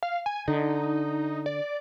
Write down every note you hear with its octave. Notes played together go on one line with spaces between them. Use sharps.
F5
G#5
D3 D#4
D5